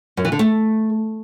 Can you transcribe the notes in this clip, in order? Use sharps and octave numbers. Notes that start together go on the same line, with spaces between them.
F#2
E3
D3
A3